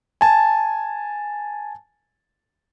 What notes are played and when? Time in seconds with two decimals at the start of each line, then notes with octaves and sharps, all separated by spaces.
0.21 G#5 A5